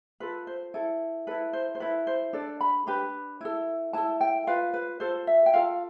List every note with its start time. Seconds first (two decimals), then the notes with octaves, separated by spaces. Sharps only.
0.20 F4 A4 B4
0.47 C5
0.74 E4 A4
1.27 E4 A4 B4
1.53 C5
1.75 C5
1.80 E4 A4 B4
2.07 C5
2.33 D4 A4 D5
2.61 B5
2.87 D4 G4 B4 B5
3.41 E4 A4
3.93 E4 A4 A5
4.21 G5
4.47 F4 B4 F5
4.74 B4
5.00 F4 A4 C5
5.27 E5
5.46 G5
5.54 F4 A4 F5